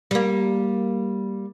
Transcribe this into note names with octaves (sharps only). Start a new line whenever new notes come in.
G3 A#3